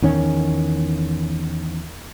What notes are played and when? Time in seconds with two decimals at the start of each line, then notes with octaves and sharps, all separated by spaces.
0.02 E2 D#3 C#4